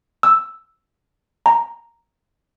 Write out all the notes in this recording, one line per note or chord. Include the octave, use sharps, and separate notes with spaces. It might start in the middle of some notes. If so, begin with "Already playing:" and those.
E6
A#5